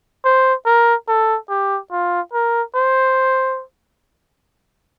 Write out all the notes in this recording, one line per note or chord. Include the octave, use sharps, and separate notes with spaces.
C5
A#4
A4
G4
F4
A#4
C5